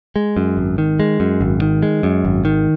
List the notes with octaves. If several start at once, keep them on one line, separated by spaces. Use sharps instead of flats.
G#3
F#2
G#1
D#3
G#3
F#2
G#1
D#3
G#3
F#2
G#1
D#3